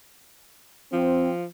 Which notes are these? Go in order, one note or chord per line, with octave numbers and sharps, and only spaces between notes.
F3 C4